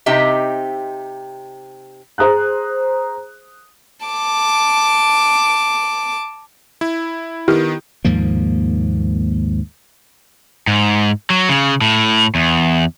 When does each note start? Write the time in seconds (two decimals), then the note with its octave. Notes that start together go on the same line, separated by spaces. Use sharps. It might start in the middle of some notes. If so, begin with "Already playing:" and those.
0.06 C3 C4 D#4 G4 D#5 E5
2.18 G#4 C5 A#5 D#6 F#6
4.06 A5 D6
6.81 E4
7.48 D#3 B3 E4 G4 F6
8.05 D#2 G#2 F3 A#3
10.67 G#2
11.30 F#3
11.49 C#3
11.81 A2
12.35 E2